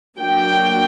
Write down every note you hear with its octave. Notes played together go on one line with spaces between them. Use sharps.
F#3 A#3 D4 G5